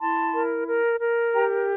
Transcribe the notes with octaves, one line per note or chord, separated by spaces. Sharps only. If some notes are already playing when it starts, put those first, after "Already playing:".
E4 A5 C6
A#4
A#4
A#4
G4 G5 A#5